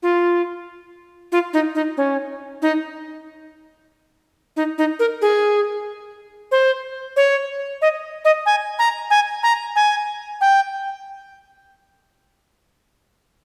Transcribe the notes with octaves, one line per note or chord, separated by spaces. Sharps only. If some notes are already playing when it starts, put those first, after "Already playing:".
F4
F4
D#4
D#4
C#4
D#4
D#4
D#4
A#4
G#4
C5
C#5
D#5
D#5
G#5
A#5
G#5
A#5
G#5
G5